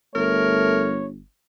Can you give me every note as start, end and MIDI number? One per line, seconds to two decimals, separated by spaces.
0.15 1.23 31
0.15 0.98 57
0.15 1.04 70
0.15 1.07 73